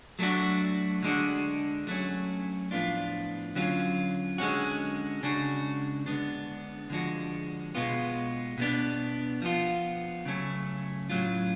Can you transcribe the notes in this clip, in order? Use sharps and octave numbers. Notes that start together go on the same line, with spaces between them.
F#3 A3 D4 F#4
D3 G#3 D4 F#4
F#3 A3 C#4
A2 F3 B3 D4 F4
D3 F#3 C#4 F4
D3 G#3 C#4 F#4
C#3 G#3 D4 F#4
D3 G#3 B3 D4
D3 F3 G#3 D4 F#4
B2 G#3 B3 F4
B2 G#3 B3 D4
F3 B3 F4
C#3 F#3 A3 C#4
A2 F#3 C#4 F4